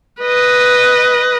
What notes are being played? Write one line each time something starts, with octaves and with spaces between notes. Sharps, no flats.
B4 D#5